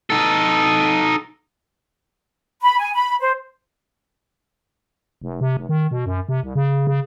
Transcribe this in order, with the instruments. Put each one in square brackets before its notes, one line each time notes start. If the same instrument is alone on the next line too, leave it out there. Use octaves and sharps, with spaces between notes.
[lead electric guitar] D#4 A4
[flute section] B5
G#5
B5
C5
[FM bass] F1
C3
F1
D#3
B2
F#2
C3
C2
C#3
C#3